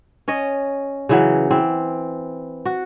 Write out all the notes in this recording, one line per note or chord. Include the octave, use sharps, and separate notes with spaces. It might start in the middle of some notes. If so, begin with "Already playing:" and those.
C#4 C#5 D#5
C#3 E3 F#3
E3 C4
F#4